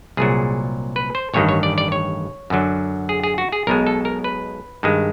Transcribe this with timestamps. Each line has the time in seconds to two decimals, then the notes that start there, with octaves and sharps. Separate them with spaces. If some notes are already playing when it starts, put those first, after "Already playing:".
0.17 C2 A#2 F#3 G#4
0.96 B4
1.15 C5
1.34 A1 G2 D#3 C#5
1.49 C#5
1.63 D5
1.78 D5
1.92 C#5
2.50 F#2 D3 F#3
3.09 G#4
3.23 G#4
3.38 F#4
3.52 G#4
3.67 B1 B2 G#3 A#4
3.86 A4
4.05 A#4
4.24 B4
4.83 G2 D#3 G#3